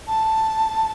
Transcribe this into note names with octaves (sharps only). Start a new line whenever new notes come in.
A5